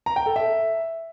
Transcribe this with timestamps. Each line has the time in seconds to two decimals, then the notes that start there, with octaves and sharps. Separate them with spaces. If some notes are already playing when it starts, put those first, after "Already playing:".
0.06 A#5
0.16 G5
0.26 A4
0.36 E5